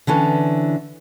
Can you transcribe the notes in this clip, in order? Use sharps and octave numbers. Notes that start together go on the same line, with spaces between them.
D3 E3 C#4 A4